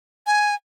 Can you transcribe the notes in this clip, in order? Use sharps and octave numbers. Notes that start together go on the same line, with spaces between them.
G#5